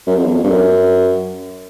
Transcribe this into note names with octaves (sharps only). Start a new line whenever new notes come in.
F#2
F2
E2
F2
G2
F#2